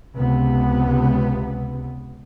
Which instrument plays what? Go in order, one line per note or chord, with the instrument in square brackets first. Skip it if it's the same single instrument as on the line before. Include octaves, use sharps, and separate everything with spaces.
[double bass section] C#2 C3 B3